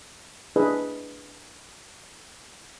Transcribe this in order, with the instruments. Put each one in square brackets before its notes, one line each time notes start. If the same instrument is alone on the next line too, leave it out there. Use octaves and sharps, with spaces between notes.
[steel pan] D4 E4 G#4 B4 D#5